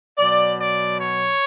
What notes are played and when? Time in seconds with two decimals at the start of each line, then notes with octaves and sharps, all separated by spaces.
0.18 B2 F#3 D5
0.60 D5
1.01 C#5